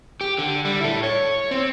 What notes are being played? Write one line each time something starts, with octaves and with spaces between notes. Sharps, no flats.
G4
D3
G3
E4 A4
C#5
C4